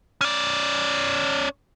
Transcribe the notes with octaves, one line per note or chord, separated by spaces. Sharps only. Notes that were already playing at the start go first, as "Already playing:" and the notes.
C#4 D5